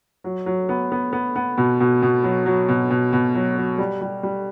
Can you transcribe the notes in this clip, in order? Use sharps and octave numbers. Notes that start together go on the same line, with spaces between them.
F#3
F#3
B3
B3
B3
B3
B2
B2
B2
F#3
F#3
B2
B2
B2
F#3
F#3
G3
G3
G3